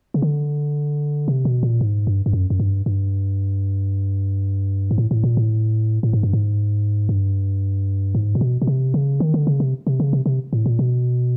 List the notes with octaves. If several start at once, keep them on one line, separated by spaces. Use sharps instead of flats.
C#3
D3
C3
B2
A#2
G#2
G2
G2
F#2
F#2
G2
G2
G#2
A2
A2
A#2
A2
A2
G#2
G2
G#2
G2
G#2
A#2
B2
B2
C3
C#3
D#3
D3
C#3
C3
C3
C#3
C3
C3
A2
A#2
B2